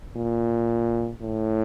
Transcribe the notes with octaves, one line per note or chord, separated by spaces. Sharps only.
A#2
A2